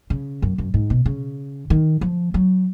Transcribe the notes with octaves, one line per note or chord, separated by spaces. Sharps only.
C#3
F#2
F#2
G#2
B2
C#3
D#3
F3
F#3